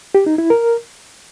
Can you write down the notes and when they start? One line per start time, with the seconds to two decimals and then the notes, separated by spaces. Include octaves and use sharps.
0.15 G4
0.26 D#4
0.38 E4
0.50 A#4